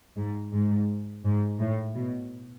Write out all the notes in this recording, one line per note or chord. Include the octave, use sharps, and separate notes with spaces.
G#2
G#2
G#2
A2
B2